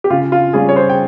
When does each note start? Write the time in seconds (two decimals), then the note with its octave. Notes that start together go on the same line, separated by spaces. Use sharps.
0.04 G4
0.10 C#3 F4
0.32 F4
0.53 G3 C#4 F4 G#4
0.69 C#5
0.75 G#4 C5
0.90 G5